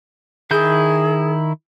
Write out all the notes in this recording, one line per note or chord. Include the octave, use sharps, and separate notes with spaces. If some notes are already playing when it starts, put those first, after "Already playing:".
D#3 E4 G#4 G6